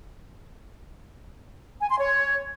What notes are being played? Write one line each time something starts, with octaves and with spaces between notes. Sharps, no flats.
G#5
C6
C#5